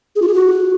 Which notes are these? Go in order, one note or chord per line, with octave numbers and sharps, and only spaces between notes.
G#4
F4
G#4
F#4